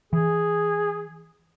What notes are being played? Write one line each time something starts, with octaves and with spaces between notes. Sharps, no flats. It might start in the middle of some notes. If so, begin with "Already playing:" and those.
E3 G#4